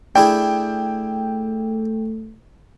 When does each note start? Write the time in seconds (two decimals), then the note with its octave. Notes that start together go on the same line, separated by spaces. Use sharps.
0.16 A3 D4 E4 G#4 G5